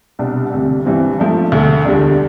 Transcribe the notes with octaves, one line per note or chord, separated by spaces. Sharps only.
C2 B2 G3 D4
D2 C3 G3
G2 E3 G3 C4
F3 A3 D4
D2 D3 A3
E2 D3 G3 D4